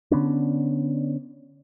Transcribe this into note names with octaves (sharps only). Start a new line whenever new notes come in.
D3 B3 C#4 D4